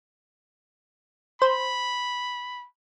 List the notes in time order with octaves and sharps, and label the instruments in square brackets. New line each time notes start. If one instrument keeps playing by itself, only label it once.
[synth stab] C5 [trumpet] B5